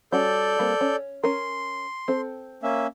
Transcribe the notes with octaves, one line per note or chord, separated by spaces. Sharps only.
G3 C#4 F#4 A4 D5 G6
G3 A#3 C4
C#4
C#4 A#4 C6
C4 A4
A#3 C#4 E5